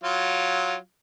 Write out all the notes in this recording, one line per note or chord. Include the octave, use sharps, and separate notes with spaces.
F#3 F4